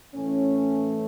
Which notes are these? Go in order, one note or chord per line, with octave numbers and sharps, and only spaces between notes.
A2 E3 A3 C#4